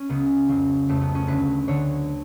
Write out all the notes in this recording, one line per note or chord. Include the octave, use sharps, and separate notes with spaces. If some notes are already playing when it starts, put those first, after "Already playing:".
Already playing: C#4
C#2 C#3 F#3 B3
F2 C#3 F#3
F2 C#3 F#3 A3
B3
C#4
D2 D3 F#3 B4
D2 D3 F#3 C#5